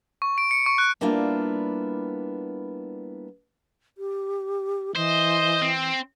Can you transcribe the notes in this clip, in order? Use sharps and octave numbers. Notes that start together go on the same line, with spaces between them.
C#6
D7
C#7
C#6
F#6
G3 A#3 B3 D4 E4 F4
G4
E3 C5 D#5
C4